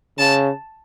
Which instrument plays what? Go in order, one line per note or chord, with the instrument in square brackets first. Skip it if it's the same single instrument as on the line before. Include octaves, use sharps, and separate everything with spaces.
[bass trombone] C#3 [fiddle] A5